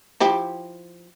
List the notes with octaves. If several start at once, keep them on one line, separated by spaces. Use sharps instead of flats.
F3 E4 G4